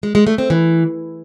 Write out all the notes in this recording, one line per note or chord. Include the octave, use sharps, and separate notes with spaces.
G#3
G#3
A3
C4
E3